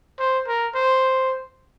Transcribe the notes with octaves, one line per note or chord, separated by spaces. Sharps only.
C5
A#4
C5